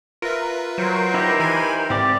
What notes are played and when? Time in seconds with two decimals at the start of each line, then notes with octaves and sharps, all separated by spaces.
0.22 F4 A#4 B4 E5
0.78 F#3 A#4 C5
1.14 D#4 E4 G4
1.40 E3 G#5 B5 G#6
1.90 G#2 C4 G4 D5